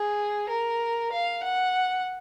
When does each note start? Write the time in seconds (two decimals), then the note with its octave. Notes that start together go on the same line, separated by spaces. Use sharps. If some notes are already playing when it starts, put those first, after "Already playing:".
Already playing: G#4
0.49 A#4
1.12 F5
1.43 F#5